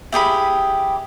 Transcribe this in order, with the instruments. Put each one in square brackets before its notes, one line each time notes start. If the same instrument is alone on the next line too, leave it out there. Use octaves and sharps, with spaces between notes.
[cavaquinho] E4 G4 G#4 B5